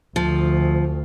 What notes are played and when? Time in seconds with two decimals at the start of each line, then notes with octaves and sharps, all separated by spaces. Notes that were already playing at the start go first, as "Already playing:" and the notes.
0.16 D2 F3